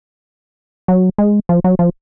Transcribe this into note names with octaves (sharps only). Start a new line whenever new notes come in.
F#3
G#3
F3
F#3
F3